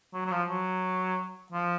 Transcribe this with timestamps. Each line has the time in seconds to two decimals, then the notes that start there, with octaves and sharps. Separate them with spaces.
0.13 F#3
0.25 F#3
0.32 F3
0.49 F#3
1.52 F3